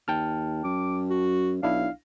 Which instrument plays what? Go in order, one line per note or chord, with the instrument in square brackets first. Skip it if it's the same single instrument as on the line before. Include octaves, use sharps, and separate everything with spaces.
[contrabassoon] D#2 [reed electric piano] G5 A5 F6
[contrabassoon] F#2 [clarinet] D6
[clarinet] F#4
[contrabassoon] B1 [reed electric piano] D4 E4 [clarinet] F5